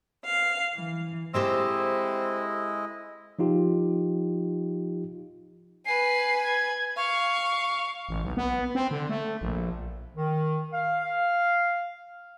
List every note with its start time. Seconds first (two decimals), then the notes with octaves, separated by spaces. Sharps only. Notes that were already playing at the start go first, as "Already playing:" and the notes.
0.23 F5
0.75 E3
1.34 G#3 C4 E4 G4 A4 C5 D#5
3.39 F3 D#4 F4 G4
5.86 B4 G#5 C7
6.43 G#6
6.97 F5 C#6
8.09 A1
8.23 B1
8.37 B3
8.75 C4
8.91 D3
9.09 A3
9.41 A#1
10.16 D#3
10.73 F5